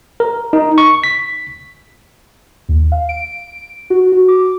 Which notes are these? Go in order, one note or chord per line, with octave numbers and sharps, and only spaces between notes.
A#4
D#4
C#6
B6
D#2
F5
D7
F#4
F#4
D6